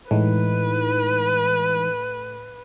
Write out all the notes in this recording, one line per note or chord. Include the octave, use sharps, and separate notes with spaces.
A2 E3 G#3 D#4 B4